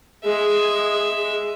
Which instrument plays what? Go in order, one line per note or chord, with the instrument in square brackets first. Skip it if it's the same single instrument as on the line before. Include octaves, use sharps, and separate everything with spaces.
[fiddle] G#3 E5 [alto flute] G#4